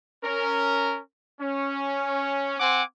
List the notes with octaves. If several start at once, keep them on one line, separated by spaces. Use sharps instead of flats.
C#4 A#4
C#4
C4 C5 F#5 G#5 D6